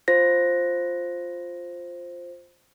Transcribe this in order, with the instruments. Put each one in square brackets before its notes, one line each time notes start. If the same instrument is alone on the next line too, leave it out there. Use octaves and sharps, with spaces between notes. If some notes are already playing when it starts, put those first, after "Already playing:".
[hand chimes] F4 C5 A#6